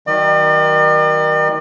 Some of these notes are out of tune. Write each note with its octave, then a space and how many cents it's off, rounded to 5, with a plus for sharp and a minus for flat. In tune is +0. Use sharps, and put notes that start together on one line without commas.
D#3 +20 F#3 +25 D5 +45